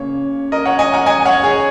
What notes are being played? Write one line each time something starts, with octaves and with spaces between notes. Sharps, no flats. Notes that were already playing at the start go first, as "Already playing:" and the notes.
Already playing: C#3 A#3 C#5
A#4 D#5
C#5 F#5
D#5 G#5
F#5 A#5
D#5 G#5
C#5 F#5
G#4 C#5